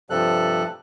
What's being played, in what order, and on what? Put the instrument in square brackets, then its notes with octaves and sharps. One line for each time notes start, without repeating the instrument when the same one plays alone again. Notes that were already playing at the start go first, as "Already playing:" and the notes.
[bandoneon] G2 C3 F3 G3 A4 F#6